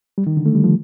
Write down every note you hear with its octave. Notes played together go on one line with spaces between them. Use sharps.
G3
D#3
D3
A3
G3
F3